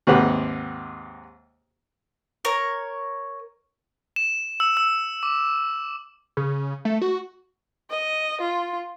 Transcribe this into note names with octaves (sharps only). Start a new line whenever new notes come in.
D#2 G#2 C3 B4 F#5
A#4 C#5
E7
E6
E6
D6
C#3
A3
F#4
D#5
F4